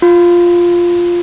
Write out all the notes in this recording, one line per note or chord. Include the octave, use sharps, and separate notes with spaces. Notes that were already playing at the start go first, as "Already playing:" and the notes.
F4